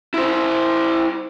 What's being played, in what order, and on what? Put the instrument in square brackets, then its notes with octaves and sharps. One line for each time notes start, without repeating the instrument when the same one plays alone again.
[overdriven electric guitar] E4 C5